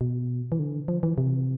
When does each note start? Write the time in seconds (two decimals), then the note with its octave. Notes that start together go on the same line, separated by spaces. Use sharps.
0.01 B2
0.52 E3
0.59 D3
0.88 F3
1.03 E3
1.18 C3